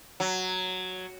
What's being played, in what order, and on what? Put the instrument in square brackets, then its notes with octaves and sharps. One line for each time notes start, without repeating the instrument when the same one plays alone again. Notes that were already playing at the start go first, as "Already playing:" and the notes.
[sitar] F#3